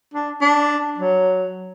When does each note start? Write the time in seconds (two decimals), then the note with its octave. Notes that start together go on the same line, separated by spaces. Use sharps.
0.14 D4
0.41 D4
0.98 F#3